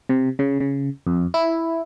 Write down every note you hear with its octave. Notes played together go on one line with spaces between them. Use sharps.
C3
C#3
C#3
F2
E4